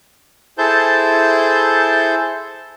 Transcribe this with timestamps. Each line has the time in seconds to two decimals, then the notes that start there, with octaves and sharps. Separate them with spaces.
0.58 E4 G#4 A4 C5 A5 G6